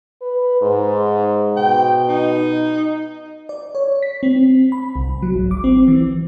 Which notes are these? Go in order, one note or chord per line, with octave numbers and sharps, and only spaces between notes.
B4
G#2
B2 G5
D#4
D5
C#5
B6
C4
B5
C2
F#3
G#1
D6
C4
E3